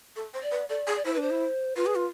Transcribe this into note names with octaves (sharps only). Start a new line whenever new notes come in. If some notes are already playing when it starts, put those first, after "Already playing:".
A4
C5
D5
B4
A4 D5
G#4
D5
E4 C5
B4
D4 C5
E4
F4 B4
G#4
F4